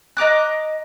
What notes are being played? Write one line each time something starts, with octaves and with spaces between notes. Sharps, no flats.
D#5 A#5 D6 F#6